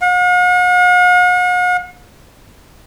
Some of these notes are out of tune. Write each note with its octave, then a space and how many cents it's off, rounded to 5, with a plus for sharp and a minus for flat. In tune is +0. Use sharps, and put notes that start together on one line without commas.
F#5 -45